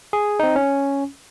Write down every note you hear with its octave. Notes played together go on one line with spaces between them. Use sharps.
G#4
C4 D#4
C#4